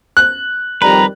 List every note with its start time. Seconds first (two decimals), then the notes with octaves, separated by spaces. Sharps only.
0.17 F#6
0.82 F2 D#3 G3 B4 A#5